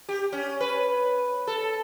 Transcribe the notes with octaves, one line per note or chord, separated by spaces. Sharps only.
G4
C#4
B4
A4